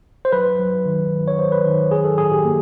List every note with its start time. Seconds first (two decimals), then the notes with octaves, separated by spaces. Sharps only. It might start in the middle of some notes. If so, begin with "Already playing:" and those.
0.25 C5
0.32 F#3 B4
0.59 F#3
0.86 D#3
1.12 D#3
1.28 C#5
1.39 F#3 C5
1.52 B4
1.65 D#3
1.91 F#3 G#4
2.04 A4
2.18 A2 G#4
2.32 G4
2.45 A#3